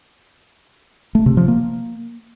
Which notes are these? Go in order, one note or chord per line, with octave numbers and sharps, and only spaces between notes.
A3
C3
F3
A#3